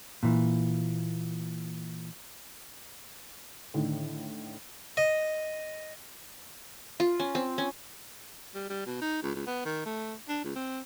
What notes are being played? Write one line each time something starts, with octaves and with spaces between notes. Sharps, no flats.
A#2 E3
A2 D3 D#3
D#5
F4
C#4
C4
C#4
G3
G3
B2
D#4
C#2
C#2
B3
D#3
A3
D4
C#2
C4